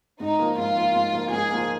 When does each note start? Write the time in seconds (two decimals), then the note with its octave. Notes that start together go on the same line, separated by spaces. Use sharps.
0.20 G#2 D#4
0.39 F3 A#3
0.58 G#2 F4
0.76 F3 A#3
0.96 G#2
1.13 F3 A#3
1.32 G#2 G#4
1.51 F3 A#3